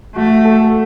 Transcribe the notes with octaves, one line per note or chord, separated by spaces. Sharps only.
A3 F#4
A4